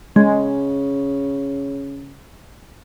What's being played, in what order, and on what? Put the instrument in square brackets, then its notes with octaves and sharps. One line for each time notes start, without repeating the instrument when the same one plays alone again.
[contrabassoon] C#3 [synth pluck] G#3